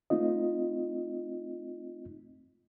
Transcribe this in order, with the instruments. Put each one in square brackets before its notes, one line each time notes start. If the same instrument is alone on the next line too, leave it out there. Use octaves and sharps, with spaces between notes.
[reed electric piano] A3 C4 D#4 F4 D#5